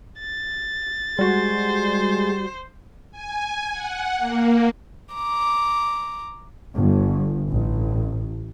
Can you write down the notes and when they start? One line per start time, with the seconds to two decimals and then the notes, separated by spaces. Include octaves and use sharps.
0.20 A6
1.19 G3 G#3 F#4 C5
3.11 G#5
3.72 F#5
4.18 A#3
5.14 A#5 D6
6.75 G1
7.49 A1